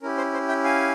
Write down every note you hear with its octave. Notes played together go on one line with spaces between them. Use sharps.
C#4 E4 G4 A#4
C5
C5
E5 G5
F5 G#5